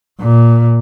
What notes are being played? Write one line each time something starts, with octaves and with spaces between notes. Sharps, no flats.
A#2